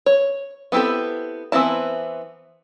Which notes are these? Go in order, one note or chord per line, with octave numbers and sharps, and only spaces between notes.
C#5
B3 C4 E4 G4 A4
E3 B3 C4 E4 A5